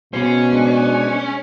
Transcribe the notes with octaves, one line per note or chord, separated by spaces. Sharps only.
B2 B3 C#4 G#4 C5
G#3 D4